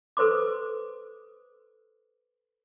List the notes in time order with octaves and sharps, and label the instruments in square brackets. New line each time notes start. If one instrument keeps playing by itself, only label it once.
[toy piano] A4 B4 C5 C6 D6